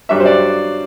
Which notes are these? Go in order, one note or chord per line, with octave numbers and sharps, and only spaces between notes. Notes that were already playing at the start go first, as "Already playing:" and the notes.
G2 F#3 E5
C5
D5